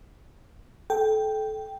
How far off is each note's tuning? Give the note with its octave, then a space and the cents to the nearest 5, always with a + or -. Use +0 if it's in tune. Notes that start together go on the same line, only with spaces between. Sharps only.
A4 -25 G5 +0